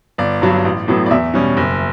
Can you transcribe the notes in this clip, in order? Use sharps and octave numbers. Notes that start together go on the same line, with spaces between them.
G1 D5
G2 F#3
A1
A2 F#3 B3
D5
E2 E5
B2 G3 C#4
F#1